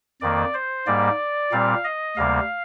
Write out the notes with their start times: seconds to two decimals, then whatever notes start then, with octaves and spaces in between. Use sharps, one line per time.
0.21 F2 D#3 A#3 D5
0.54 C5
0.87 G#2 G3 A#3 D5
1.52 A#2 G3 C4 F5
1.84 D#5
2.17 D2 C3 G3 A#3 F5